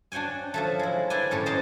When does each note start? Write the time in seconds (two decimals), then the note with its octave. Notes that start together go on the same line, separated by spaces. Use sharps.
0.12 D4 F#4 C#5 G5 G#5
0.54 F3 F#3 A3
0.79 G#3 E4
1.10 E4 G4 B4 D5 G5 G#5
1.31 F#2 A2 B4 C#5
1.46 C5 D5 D#5 A5 A#5 C6